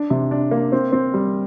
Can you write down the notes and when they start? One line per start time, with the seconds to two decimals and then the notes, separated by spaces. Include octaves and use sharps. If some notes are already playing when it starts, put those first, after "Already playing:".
Already playing: D4
0.10 C3
0.31 D4
0.51 A#3
0.72 C4
0.92 C4
1.14 G3